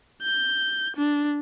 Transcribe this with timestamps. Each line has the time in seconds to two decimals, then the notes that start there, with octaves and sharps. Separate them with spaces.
0.22 G6
0.97 D4